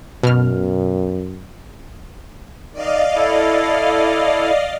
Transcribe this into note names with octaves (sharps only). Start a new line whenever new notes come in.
F#2 B2 F6
D#3 D5 D#5 F5
E4 A4